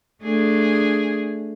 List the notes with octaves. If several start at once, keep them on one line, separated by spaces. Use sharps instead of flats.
A3 D4 G#4